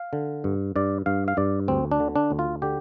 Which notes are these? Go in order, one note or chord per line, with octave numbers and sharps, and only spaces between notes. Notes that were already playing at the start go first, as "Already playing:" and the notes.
Already playing: F5
D3
G2
G2 D5
G2 F5
F5
G2 D5
D2 C4
D4
D3
D4
D2
F4
D3 G4